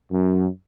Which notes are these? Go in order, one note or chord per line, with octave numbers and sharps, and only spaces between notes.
F#2